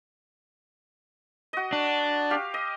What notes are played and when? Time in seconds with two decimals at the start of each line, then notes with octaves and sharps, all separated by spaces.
1.53 F#4 D#5
1.73 D4
2.31 G4 F5
2.54 D#5